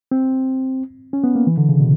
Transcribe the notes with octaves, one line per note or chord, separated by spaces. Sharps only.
C4
C#4
B3
A#3
E3
D3
C#3
B2